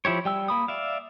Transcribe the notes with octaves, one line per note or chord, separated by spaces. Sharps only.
F3 E4 G4 C#5
G3 G5 E6
A#3 B5 D#6
D5 E5 F5